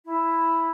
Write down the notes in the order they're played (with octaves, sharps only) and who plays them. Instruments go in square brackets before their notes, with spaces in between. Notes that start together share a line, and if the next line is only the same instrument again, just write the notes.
[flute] E4